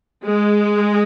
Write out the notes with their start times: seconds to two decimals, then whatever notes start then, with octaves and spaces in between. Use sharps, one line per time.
0.24 G#3